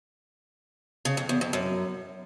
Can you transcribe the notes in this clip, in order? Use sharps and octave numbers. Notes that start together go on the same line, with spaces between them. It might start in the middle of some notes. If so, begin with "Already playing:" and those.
C#3
F2
E2
F2
F#2